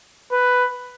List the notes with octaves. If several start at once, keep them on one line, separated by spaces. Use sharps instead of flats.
B4